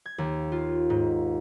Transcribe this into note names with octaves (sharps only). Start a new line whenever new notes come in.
G#6
D#2
F4
G#2